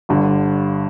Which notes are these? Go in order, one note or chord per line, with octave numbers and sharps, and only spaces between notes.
G1 G2 D3